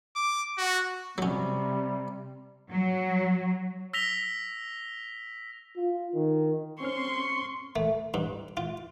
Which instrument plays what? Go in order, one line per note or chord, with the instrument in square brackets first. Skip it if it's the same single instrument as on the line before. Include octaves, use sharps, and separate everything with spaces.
[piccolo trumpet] D6
F#4
[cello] C3 [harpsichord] F#3 C#4 [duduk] G3
[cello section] F#3
[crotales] E6 A#6 B6 F7 G7
[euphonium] F4
D#3
[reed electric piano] C4 C#4 F6 [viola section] C6 [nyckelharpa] C#6
[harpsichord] A3
G2
F4